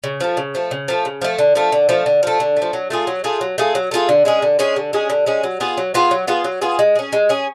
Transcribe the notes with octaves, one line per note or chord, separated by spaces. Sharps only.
C#3
F3 A3
C#3
F3 A3
C#3
F3 A3
C#3
F3 A3
D3
F3 A3
D3
F3 A3
D3
F3 A3
D3
A3
F3
F#3
A3 F4 G#4
F#3
A3 F4 G#4
F#3
A3 F4 G#4
F#3
A3 F4 G#4
D3
G#3 C#4 G#4
D3
G#3 C#4 G#4
D3
G#3 C#4 G#4
D3
G#3 C#4 G#4
F#3
B3 F4 G#4
F#3
B3 F4 G#4
F#3
B3 F4 G#4
F#3
B3 F4 G#4
G#3
C#4 G#4
G#3
C#4 G#4